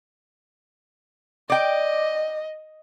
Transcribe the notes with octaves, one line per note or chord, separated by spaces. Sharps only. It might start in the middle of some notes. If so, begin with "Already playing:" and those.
D5 D#5 G5